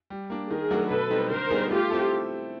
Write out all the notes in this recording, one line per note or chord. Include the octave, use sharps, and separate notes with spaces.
G3
A#3 D4
D#3 G#4 A#4
F#3 A3 D4 F#4
B2 A4 B4
G3 C4 D#4
D3 A#4 C5
G3 B3 D#4 G#4
A3 F4 G4
C4 E4 A4